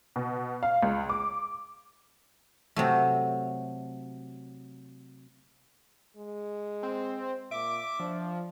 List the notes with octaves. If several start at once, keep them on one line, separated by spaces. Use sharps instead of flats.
B2
F5
C#2
D6
C3 F#3 A3
G#3
C4
A#2 E5 D6
F3 D4